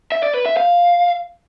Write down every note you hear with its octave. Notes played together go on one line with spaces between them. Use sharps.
E5
D5
B4
E5
F5